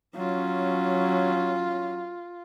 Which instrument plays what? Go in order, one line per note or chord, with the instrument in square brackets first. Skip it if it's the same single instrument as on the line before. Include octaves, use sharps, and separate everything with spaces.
[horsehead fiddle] F#3 C#4 [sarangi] F4